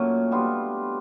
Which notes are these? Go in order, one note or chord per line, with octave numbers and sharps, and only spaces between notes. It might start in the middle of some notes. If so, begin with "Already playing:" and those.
Already playing: A#2 F#3 A3 C#4
G3 B3 D4 F4